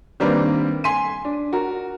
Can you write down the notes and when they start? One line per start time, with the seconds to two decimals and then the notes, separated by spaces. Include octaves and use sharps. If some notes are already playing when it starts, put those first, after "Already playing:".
0.20 D#3 G3 A#3 C4 D4 B4
0.84 G#5 C6 B6 D#7
1.25 D4
1.53 F#4 A#4